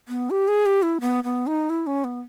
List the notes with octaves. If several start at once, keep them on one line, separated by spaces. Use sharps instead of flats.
B3
G4
G#4
G4
E4
B3
B3
D#4
E4
C#4
B3